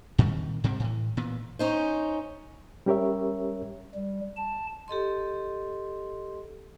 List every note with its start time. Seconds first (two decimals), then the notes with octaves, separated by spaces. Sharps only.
0.18 A#2 D#3 G3 C4
0.64 G#2 C3 G3 C4
0.80 A2 E3
1.17 A#2 E3 B3
1.59 C#4 D#4 C5
2.86 G3 C#4 G4 A#4 C#5 E5
3.95 G3
4.37 A5
4.88 G4 A4 D#5 C6